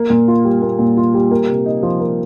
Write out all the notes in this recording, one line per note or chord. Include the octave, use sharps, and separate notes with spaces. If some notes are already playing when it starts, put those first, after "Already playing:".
Already playing: A#3
A#2
F4
G3
A#3
A#2
F4
G3
A#3
C3
D#4
F3
A#3